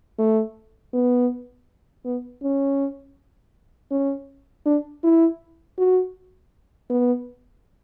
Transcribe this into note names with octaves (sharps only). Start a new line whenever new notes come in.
A3
B3
B3
C#4
C#4
D4
E4
F#4
B3